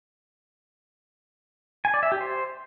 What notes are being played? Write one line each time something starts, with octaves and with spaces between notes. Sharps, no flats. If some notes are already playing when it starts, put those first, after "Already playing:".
G#5
D5
E5
G4
C5